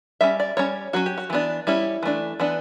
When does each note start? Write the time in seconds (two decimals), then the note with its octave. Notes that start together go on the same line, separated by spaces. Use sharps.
0.21 G3 C#4 E5
0.40 D5
0.57 G3 C#4 C#5
0.93 F#3 C#4 F#4
1.06 G4
1.18 F#4
1.30 E3 B3 D4
1.67 G3 C#4 E4
2.03 E3 A3 D4
2.40 E3 B3 D4